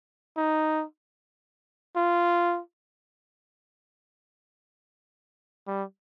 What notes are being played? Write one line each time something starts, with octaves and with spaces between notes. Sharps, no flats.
D#4
F4
G3